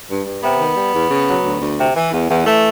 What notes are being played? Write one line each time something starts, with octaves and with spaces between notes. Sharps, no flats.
G2
G2
C3 B3
D#3
G3
E2
C#3
F#3
D2
D2
C3
E3
E2
E2
E3 A3